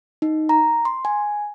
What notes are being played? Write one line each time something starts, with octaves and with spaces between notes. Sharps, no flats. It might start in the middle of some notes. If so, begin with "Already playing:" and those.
D#4
A#5
C6
G#5